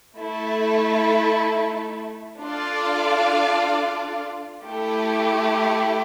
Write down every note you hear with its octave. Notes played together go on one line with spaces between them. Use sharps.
A3 E4 A4
D4 F4 A4 D5 F5
A3 E4 G4